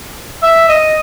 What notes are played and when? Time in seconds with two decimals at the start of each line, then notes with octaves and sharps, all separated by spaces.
0.43 E5
0.69 D#5